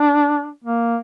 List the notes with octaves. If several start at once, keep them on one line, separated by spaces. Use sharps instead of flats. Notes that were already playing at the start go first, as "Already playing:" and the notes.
Already playing: D4
A#3